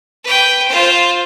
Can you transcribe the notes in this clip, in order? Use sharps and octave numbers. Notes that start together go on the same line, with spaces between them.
B4 G5
F4 C5